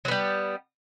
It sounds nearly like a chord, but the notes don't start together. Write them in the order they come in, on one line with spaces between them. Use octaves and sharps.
F#3 B3 G3